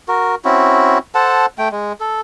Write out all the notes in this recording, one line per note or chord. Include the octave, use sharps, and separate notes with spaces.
F#4 A#4
C4 C#4 E4 F#4
A4 C5 F#5 A5
A3 G5
G#3
A4